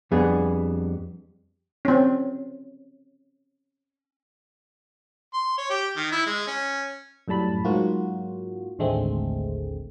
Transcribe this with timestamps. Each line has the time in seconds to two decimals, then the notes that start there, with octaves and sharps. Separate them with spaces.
0.11 F2 G3 B3 D4 G#4
1.85 C4 C#4
5.34 C6
5.58 C#5
5.70 G4
5.97 D#3
6.12 E4
6.26 G#3
6.48 C#4
7.28 F#2 A2 G3 A5 B5
7.65 G#2 F#3 A#3 F4 F#4
8.79 A1 D#2 D3 G#3 A3 C4